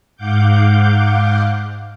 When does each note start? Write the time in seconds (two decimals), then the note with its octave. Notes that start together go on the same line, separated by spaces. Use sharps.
0.16 G#2 F5 F#5 D6 G6